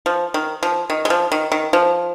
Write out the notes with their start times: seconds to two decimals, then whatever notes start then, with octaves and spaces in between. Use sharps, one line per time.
0.06 F3
0.34 D#3
0.63 F3
0.90 D#3
1.05 G#3
1.10 F3
1.32 D#3
1.52 D#3
1.73 F3